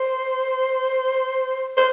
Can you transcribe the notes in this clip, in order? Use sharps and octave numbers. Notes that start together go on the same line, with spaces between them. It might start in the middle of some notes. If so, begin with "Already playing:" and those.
Already playing: C5
C5